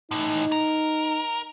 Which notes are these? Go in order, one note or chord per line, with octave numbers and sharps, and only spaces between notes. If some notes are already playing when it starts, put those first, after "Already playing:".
A2 E3 D#4
A#4